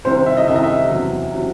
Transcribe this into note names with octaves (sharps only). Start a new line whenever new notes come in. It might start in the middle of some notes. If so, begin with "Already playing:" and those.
C2 C3 D#3 C5
E5
D#5
C2 C3 D#3 E5
D#5
E5
E2 C3 F#3
C3 F#3